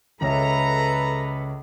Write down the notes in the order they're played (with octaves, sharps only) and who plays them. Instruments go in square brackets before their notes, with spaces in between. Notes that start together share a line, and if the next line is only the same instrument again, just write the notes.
[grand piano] C#2 C#4 E5 [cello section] A4 B4 [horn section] A#5